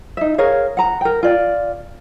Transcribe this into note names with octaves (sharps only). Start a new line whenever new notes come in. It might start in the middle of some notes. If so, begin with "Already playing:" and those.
D#4 E5
G#4 A#4 C#5 F5
F#5 A#5
A#4 G5
F4 D5 G5